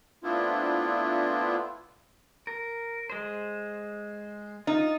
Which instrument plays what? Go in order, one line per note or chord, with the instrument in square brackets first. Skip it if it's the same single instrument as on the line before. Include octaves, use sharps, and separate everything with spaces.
[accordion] A3 B3 C4 D4 E4 F4
[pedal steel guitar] A#4
G#3 C5
[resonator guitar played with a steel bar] D#4 [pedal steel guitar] F4